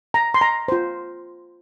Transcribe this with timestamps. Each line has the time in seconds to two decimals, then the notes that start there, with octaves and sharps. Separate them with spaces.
0.14 A#5
0.34 C6
0.41 A#5
0.68 F4 C5